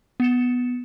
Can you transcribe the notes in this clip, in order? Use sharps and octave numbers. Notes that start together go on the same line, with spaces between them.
B3 C#7 E7